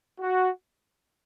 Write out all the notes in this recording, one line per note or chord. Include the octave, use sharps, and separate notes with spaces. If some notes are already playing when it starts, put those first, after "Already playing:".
F#4